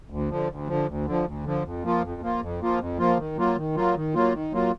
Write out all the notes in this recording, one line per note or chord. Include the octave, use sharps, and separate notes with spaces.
D2
D3 F3
D2
D3 F3
D2
D3 F3
D2
D3 F3
F2
F3 A#3 F4
F2
F3 A#3 F4
F2
F3 A#3 F4
F2
F3 A#3 F4
D#3
F#3 A#3 F4
D#3
F#3 A#3 F4
D#3
F#3 A#3 F4
D#3
F#3 A#3 F4